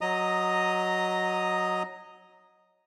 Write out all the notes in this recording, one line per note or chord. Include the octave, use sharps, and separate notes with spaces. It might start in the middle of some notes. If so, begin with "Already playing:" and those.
F#3 D#5 A#5 D#6